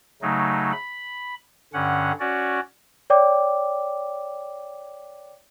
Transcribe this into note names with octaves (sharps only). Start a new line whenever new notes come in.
C#3 F#3 A3 D#4
B5
G2 D3 C#4 F#5
C#4 F#4 D5
C#5 D5 G5 D6